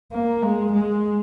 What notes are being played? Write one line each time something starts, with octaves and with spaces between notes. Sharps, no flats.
A#3
G#3
G#3